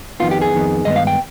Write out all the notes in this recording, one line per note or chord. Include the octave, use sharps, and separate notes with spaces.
F2 D#3 B3 F4
G4
G#4
F2 D#3 B3
G2 D#3 G#3 B3 D#5
F5
G5